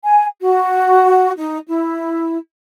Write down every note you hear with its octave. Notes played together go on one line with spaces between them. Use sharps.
G#5
F#4
D#4
E4